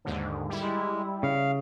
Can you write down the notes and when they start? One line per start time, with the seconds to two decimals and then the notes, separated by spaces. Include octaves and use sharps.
0.05 D#2 G#2 D3
0.49 G3 E4
0.61 G#3
1.23 C#3 F5